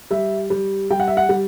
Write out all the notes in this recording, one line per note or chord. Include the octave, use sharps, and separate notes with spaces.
G3 E5
G3
G3 G5
F#5
E5
F#5
G3